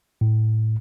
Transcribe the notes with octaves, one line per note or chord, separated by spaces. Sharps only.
A2